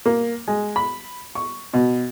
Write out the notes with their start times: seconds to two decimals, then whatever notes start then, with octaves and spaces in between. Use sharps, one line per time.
0.06 A#3
0.48 G#3
0.76 B5
1.35 C#6
1.74 B2